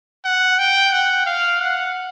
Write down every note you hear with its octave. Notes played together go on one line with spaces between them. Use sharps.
F#5
G5
F#5
F5
F#5